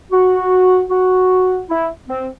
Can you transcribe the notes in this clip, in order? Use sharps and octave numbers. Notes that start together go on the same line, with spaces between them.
F#4
F#4
E4
C4